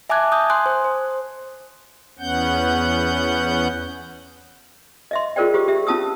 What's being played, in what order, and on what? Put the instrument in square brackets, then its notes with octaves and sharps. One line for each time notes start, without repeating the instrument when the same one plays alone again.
[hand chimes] E5 G#5 A5 D6 F#6 G#6
D#6 G6
G#5 C6 F#6
C5
C5
[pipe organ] E2 B3 C#4 F#5 G6
[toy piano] D#5 E5 C6
F4 G#4 A#4 C5 D5 G5
F4 G4 C5 D6
G4 E5
C#4 F4 A5 D#6 E6